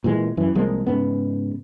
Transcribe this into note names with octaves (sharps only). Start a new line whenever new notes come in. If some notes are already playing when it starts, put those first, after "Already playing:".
A#2 E3 F#3 G#3
F#2 E3
C2 F3 G#3 A#3
G#2 C#3 B3